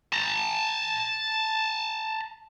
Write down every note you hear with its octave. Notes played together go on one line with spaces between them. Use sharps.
A5 A#5